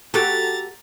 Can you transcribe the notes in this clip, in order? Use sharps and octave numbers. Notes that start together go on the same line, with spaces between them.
F#4 G4 A4 A#5 A6